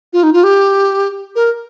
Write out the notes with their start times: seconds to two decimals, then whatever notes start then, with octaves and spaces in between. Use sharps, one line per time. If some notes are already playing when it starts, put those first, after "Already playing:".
0.13 F4
0.23 D#4
0.33 F4
0.44 G4
1.36 A#4